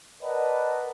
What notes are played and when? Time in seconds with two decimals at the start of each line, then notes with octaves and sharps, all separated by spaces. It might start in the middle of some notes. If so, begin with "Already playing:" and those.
0.23 A#4 B4 D5 D#5 F#5 A5